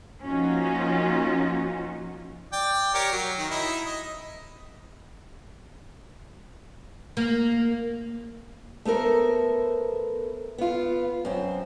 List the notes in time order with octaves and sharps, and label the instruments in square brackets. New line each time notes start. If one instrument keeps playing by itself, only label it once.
[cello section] F3 A#3 C#4 D#4 F4 F#4
[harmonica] D5 G5
G4 A#4 C#5
F#3
D#3
D#4 E4
D#5
[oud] A#3
[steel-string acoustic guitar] A3 B3 A4 A#4 C5
B3 F4
F#2 C4